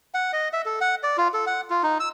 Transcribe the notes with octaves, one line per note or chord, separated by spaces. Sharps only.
F#5
D#5
E5
A4
F#5
D5
F4
A4
F#5
F4
D#4
E6